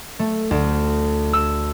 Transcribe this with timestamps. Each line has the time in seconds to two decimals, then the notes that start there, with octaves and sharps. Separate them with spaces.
0.19 A3
0.51 D2
1.33 E6